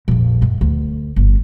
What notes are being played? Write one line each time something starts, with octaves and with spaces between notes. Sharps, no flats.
A#1 F2
F#2
D2
G1